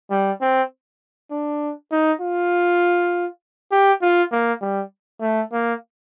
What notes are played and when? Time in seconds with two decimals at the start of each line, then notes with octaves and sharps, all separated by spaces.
0.10 G3
0.41 C4
1.31 D4
1.91 D#4
2.21 F4
3.72 G4
4.02 F4
4.32 A#3
4.61 G3
5.21 A3
5.52 A#3